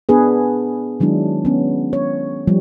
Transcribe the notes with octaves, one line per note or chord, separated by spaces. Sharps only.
B3 D4 G#4 B4
D#3 F#3 G#3 D4 E4
B3 C#4
C#5
F3 G3